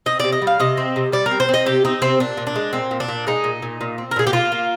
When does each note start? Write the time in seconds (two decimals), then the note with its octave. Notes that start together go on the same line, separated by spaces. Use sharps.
0.06 C4 D#5
0.20 C3 D5
0.32 D#5
0.42 G3
0.47 F5
0.60 C3 D#5
0.77 C4
0.96 C3
1.12 G3 D5
1.26 A#4
1.31 C4
1.40 C5
1.49 C4
1.54 D#5
1.66 C3 G4
1.85 C4 D#4
2.02 C3 C4
2.20 A#2 D4
2.37 A#2
2.47 D4
2.56 G#3
2.73 A#2 C4
2.91 A#2
3.00 D4
3.08 A#2
3.27 G#3 D#4
3.44 A#2
3.62 A#2
3.81 A#2
3.98 C4
4.11 A#4
4.16 A#2 G#4
4.27 G4
4.33 A#3 F4
4.52 A#3